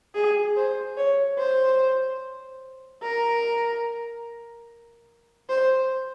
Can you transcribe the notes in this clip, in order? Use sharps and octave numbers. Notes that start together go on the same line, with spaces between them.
G#4
C5
C#5
C5
A#4
C5